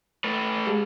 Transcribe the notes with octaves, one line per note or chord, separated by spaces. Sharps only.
A3 B4
G#3 G4 G#4